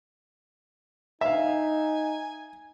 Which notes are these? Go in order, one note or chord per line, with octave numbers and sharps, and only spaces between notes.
D#4 E5 F5 G#5